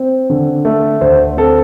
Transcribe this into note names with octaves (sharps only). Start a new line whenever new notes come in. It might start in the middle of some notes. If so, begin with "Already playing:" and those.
Already playing: C4
D3
A3
D2 C5
C4 A4